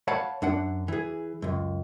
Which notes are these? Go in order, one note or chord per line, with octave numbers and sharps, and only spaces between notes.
C#5 F5 F#5 A5 B5
F#2 D4 F#5
E3 G#4
C#2 F#2